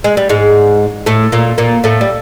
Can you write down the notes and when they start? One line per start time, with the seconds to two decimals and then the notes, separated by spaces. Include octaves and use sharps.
0.04 G#3
0.17 G3
0.29 G#2 G#3
1.06 A2 A3
1.32 A#2 A#3
1.58 A#2 A#3
1.84 A2 A3
2.01 G3